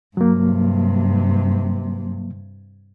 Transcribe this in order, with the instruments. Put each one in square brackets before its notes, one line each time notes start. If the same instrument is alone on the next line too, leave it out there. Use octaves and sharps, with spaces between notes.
[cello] G2 C3 [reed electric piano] F#3 A#3